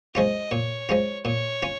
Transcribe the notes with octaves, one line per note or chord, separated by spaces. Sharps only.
F3 G#3 C#4 F4 D#5
A#2 C#5
F3 G#3 C#4 F4
A#2 C#5
C#4 F4